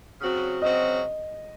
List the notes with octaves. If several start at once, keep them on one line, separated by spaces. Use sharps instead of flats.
C#3 F#3 C4 F#4
C#3 F#3 C4 F#4 D#5